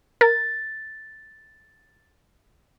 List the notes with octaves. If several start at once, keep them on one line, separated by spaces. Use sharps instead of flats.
A#4 A6